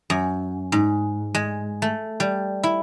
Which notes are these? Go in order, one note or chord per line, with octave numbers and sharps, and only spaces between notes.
F#2
G#2
G#3
A3
G3
E4